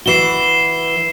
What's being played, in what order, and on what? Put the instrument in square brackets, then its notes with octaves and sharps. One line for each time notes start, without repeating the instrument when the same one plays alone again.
[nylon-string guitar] E3 F#4 [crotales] C7 E7 G7